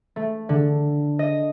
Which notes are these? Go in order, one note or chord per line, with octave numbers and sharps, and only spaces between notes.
A3
D3
D#5